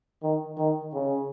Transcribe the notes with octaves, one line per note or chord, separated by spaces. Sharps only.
D#3
D#3
C#3